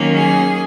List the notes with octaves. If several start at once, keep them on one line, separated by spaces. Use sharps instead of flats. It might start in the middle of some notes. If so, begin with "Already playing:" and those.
Already playing: D#3 F#3 A#3 C#4
G#4